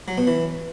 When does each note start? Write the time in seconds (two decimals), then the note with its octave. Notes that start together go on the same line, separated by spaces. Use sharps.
0.08 F#3
0.18 B2
0.27 E3